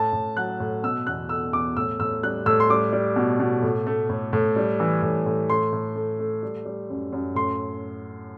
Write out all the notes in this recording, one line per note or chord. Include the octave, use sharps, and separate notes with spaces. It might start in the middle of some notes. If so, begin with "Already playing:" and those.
Already playing: A2 A5
A2
F#3 F#6
A2
B2 E6
E2 F#6
A3 E6
E2 D6
A2 E6
A2 E6
G3 F#6
A2 E6
C6
G3 D6
G3
B2
B2
A2
A3
A2
A2
G3
E3
A2
A2
A2 C6
A2
A3
A3
G3
G3
F#2
F#2
A2 C6